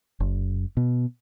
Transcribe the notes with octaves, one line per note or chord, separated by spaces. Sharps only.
F#1
B2